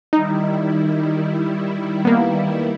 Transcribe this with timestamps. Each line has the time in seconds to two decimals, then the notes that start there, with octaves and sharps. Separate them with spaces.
0.13 D#3 G3 D#4 E4
2.05 A#3 B3